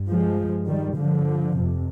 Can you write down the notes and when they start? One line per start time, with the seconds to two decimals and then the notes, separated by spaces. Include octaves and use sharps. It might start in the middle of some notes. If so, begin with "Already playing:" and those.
Already playing: G2
0.09 F3 G#3
0.39 G2
0.67 D#3 G3
0.95 G2 D3 F3
1.53 F2 C3